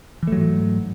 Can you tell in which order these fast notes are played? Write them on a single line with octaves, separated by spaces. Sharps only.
E3 A3 F#3 G#2